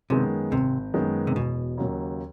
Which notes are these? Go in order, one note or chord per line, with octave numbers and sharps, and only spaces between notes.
F#2 C3 D#3 G#3 B3
G#1 C3
F#2 D#3 G#3 B3
C3
E1 B2
D#2 C#3 F#3 A#3